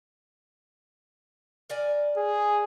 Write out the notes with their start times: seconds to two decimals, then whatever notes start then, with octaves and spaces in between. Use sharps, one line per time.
1.70 A#4 D5 G#5
2.17 G#4